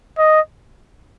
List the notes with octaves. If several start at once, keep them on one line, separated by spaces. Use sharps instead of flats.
D#5